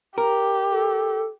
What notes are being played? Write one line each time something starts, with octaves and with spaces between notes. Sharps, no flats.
G4 A#4
A4